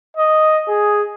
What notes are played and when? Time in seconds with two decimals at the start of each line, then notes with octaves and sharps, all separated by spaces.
0.17 D#5
0.68 G#4